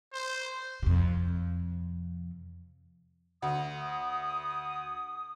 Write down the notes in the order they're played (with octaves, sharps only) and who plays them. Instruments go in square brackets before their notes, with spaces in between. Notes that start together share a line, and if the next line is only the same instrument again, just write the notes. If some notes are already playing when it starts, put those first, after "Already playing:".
[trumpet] C5
[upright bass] F2 C3
[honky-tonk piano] D2 [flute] D#6